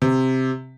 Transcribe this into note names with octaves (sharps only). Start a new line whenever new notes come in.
C3